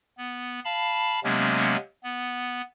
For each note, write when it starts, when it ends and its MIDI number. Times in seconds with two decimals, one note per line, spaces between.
0.17 0.60 59
0.65 1.20 77
0.65 1.20 81
0.65 1.20 83
1.24 1.76 48
1.24 1.76 54
1.24 1.76 56
1.24 1.76 58
1.24 1.76 59
1.24 1.76 61
2.03 2.61 59